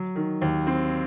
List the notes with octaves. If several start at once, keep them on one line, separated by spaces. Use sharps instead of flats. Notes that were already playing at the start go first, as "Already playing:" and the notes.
Already playing: F#3
D#3
D#2
C4